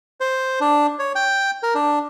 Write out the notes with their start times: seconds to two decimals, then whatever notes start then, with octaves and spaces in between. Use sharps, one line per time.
0.20 C5
0.61 D4
0.99 C#5
1.15 G5
1.63 A#4
1.75 D4